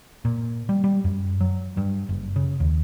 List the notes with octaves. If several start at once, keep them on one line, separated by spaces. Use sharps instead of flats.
A#2
G3
G3
F#2
F#3
G2
F#1
C#3
D#2